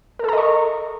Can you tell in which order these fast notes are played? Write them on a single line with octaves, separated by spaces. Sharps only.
A#4 A4 A#5 D#5 C#6